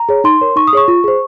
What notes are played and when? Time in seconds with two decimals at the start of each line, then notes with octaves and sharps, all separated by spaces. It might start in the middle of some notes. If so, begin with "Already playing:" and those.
Already playing: A#5
0.09 G#4 C#5
0.24 D#4 C6
0.41 A#4 C#5
0.56 D#4 C#6
0.68 D#6
0.73 G#4 C#5 C#6
0.88 F4
1.04 G#4 C5